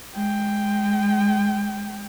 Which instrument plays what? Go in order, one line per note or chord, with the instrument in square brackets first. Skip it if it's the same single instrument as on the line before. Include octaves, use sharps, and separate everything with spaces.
[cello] G#3 G5